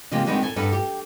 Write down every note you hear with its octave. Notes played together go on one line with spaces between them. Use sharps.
C#3 F3 G#3 A#3 C4 G4
D3 D#3 G3 G#3 B3 C4
A4 G#5
G2 B3 A4 B4
G4